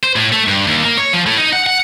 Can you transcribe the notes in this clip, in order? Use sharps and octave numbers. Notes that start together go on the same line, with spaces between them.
C5
A2
A3
G2
D#2
A#3
C#5
F3
A2
D#4
F#5
F#5